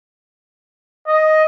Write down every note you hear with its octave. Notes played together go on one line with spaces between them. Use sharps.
D#5